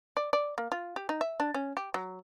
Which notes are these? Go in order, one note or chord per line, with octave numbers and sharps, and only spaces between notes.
D5
D5
A#3
F4
G4
D#4
E5
D4
C#4
G4
F#3